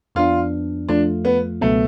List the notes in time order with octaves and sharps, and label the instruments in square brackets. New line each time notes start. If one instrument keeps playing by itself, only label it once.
[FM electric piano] F2 F3 B3 D4 [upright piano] F4
[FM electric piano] F2 F3 A3 F4 [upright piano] D4
[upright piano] B3
[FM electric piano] C#2 B2 F#3 B3 [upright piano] A3